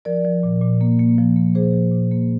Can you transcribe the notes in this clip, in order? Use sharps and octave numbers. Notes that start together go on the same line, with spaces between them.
F3 A#4 D5
F3
A#2
A#2
A#3
A#3
F3
A#3
A#2 G#4 C5
F3
A#2
A#3